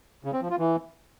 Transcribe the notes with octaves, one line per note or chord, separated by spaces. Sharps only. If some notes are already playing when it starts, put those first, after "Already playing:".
C#3
C4
F3
F4
E3